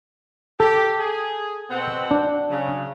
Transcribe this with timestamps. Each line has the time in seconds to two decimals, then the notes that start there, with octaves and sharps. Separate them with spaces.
0.60 G4 A4
0.99 G#4
1.70 B2 C4 F#5
2.11 D4
2.50 C#3 F#3